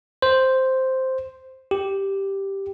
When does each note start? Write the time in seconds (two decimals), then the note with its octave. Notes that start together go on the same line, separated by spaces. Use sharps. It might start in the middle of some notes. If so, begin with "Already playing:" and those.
0.22 C5
1.71 G4